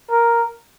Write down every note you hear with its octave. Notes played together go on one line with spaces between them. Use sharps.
A#4